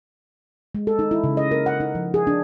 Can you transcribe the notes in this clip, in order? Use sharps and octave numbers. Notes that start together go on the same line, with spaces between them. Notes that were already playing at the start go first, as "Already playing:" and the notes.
G#3
A4
D#4
E4
C#3
D#5
A#4
F#5
D#4
F3
G#4
D4